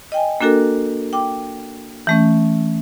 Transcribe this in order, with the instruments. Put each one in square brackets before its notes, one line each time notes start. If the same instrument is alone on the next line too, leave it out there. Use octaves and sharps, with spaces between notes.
[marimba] D#5 G5 G#5
A#3 D4 F#4 A4 A#4
G5 D6
E3 A3 C#4